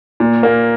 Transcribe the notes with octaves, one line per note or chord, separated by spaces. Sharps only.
A#2
A#3